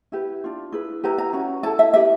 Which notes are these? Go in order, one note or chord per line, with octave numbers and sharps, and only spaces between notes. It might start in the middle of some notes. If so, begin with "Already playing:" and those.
E4 G4 B4
D4 F4
E4 G#4 B4
E4 G4 B4 A#5
A#5
C#4 F#4 B4
E4 A4 A5
E5
E4 G4 B4 E5